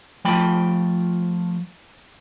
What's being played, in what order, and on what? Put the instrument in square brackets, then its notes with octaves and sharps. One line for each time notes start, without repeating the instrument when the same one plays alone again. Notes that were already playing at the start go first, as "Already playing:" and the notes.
[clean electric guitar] F3 A3 F4 G5 B5